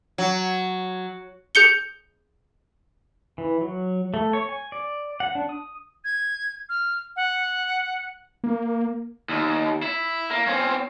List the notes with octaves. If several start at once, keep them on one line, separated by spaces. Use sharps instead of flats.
F#3
G#4 G6 C#7 G7
E3
F#3
A3
C#5
G#5
D5
F#5
D4
D#6
G#6
F6
F#5
A#3
D#2
E4
A#3
C4 C#4